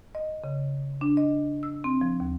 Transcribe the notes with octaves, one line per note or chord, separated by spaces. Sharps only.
D#5
C#3
D4
D#5
E6
C4
F3
D#2